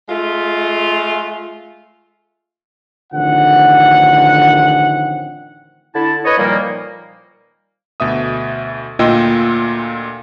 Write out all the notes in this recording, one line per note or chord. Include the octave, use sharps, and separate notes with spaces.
G#3 A3 F4
A1 D3 D#3 F3 C4 F#5
D3 E4 A5
B4 C#5 D#5
A#2 D#3 F3 G3 A#3
D2 B2 E5 D#6
D2 A#2 F4 D#5 G5 E6